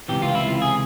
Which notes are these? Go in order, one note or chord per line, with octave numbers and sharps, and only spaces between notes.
C#2 C3 E3 G4
F4
E4
F4
G#4